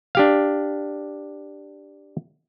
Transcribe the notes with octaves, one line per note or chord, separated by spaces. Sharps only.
D4 G4 F5